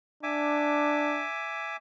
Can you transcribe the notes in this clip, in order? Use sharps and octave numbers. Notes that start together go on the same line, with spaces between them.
D4 E5 G#5 D6